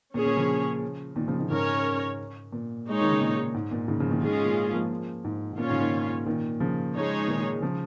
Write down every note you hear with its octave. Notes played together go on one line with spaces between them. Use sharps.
A#2 C#4 G#4 C#5
A#2
C#3 F3
A#2 D#3
C#3 F3
A#2 D#3
G#2 C#3 C#4 A#4 C#5
A#2
G#3 D#4 C#5
D#3
C#3
A#2
G#2
A#2
G#2 C#3
C#3 F3
A#2 D#3
G#2 C#3 G#3 C#4 F4 G#4
A#2
F3 A#3
G#2
G#2
A#2 C#4 F4 C#5
G#2 C#3
A#2 D#3
A#2 D#3
C#3 F3
G#3 D#4 G#4 C#5
A#2 D#3
C#3 F3